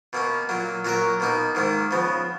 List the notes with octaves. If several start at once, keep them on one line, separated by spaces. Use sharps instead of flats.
B2 A#3 C#4
A#2 F#3 A#3
A#2 F#3 C#4 F#4 A#4
B2 A#3 D#4
G#2 D#3 A#3
C#3 F3 B3